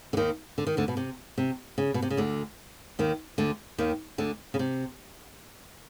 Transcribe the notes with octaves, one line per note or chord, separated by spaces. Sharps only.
D3
D#2 D#3
D3
D#3
D2 D3
B2
C3
C3
C#3
B2
C3
C#3
D2 D3
D#2 D#3
D2 D3
D#2 D#3
D2 D3
C#3
C3